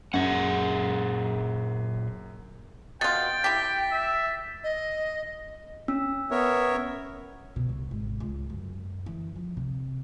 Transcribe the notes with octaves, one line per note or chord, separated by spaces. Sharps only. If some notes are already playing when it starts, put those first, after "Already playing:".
F#2 A#2 G#4 F#5
B2 F4 G5 A6
E4 G4 B6
E5
D#5
C#4 E6
B3 A#4 C#5 E5
B2
C2
G#1
C#2
F#2
E3
F3
C3